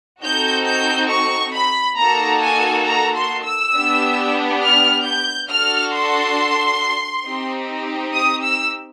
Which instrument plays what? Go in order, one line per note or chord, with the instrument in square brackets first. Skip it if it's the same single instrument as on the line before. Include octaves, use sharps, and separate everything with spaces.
[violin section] C4 D#4 F#4 A4 G6
G6
C#6
B5
A#3 D#4 F#4 A4 A#5
G#5
A#5
C6
E6
B3 D4 G4
F6
G6
D4 F#4 A4 F6
C6
C4 D#4 G4
D#6
E6